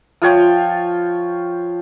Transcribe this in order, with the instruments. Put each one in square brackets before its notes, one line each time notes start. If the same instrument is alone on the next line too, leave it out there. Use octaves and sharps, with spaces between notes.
[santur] F3 F4 C#5 G5